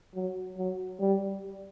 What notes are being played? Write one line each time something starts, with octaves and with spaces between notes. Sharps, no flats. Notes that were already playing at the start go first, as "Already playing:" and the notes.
F#3
F#3
G3